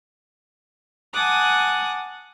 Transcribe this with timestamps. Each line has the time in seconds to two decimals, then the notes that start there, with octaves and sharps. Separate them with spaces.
1.13 F#5 G#5 A5 D6 D#6 F#6